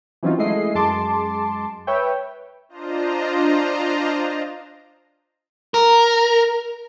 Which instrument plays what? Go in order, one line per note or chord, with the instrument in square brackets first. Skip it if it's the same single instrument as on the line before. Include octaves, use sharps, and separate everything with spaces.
[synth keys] E3 F#3 C4 C#4 D#4 F4
G#3 A3 E4 D#5 C7
F#2 G#3 A5 C6 D6
B4 C#5 E5 G5
[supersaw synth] D4 F4 C5 D#5 A#5
[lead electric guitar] A#4